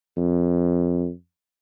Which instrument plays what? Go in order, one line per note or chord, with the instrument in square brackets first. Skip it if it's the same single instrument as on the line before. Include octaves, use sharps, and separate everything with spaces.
[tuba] F2